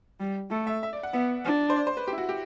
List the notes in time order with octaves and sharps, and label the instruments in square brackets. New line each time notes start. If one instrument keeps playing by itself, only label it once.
[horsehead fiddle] G3
[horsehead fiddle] A3 [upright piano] A4
[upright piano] E5
E5
D5
F#5
[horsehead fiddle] B3 [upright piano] E5
[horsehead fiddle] D4
[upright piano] C5
D5
C5
B4
G4
E4
F#4
G4